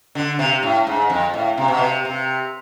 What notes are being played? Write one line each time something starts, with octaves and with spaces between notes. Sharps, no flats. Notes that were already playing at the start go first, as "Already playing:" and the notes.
D3
C3
A2
G#2
F2
A2
C3
B2
C3
C3